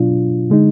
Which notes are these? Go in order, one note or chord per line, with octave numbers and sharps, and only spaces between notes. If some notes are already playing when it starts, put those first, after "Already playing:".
Already playing: B2 F#3 D4 F4
D3 G#3 D#4